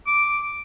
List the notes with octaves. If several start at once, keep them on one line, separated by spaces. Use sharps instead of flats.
D6